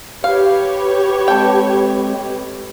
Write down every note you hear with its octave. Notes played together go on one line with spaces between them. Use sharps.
G4 B4 C#5 F5
G#3 C4 A4 G5